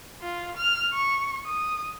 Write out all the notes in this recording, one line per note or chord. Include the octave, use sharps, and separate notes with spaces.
F4
F6
C#6
D#6